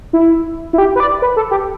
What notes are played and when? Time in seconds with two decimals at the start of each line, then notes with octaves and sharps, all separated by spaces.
0.13 E4
0.73 E4
0.78 G4
0.95 B4
1.00 D5
1.22 B4
1.36 A4
1.51 G4